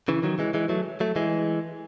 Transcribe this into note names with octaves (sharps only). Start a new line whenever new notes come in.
C#3 E3
D#3 F#3
E3 G#3
E3 G#3
F#3 A3
F#3 A3
E3 G#3